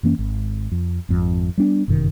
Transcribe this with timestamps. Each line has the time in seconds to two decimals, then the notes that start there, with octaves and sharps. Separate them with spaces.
0.03 F#2 E3 A#3 C#4
0.19 G#1
0.72 F2
1.09 G#1 F2
1.58 G3 B3 D4
1.88 G1 F#2 C3 D#3